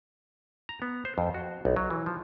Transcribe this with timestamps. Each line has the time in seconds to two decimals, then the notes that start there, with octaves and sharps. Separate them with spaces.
0.69 A#5
0.82 B3
1.05 C5
1.18 F2
1.34 F#4
1.65 B1
1.76 F#3
1.90 E3
2.06 F3